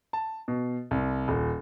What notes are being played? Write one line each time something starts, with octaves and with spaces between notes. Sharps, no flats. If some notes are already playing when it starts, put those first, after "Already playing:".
A5
B2
C2
D#1